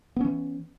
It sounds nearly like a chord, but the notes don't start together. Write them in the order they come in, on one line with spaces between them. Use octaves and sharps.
B3 C#4 E3